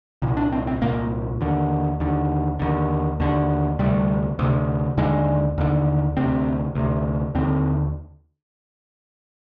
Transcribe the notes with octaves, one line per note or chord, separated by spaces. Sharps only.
C2 A#2
D4
C4
C4
C2 A#2 A#3
D#2 D3
D#2 D3
D#2 D3
D#2 D3
D2 C3 G3
D2 C3
D#2 D3 G#3
D#2 D3
D2 C3 C4
D2 C3
D#2 D3 C4